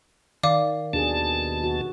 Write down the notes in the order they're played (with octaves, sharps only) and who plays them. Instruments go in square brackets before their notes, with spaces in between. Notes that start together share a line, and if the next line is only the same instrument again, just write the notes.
[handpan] D#3 [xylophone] D5 F5 D6
[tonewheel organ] D#2 B2 A5 [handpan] D4 G#4
[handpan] F#4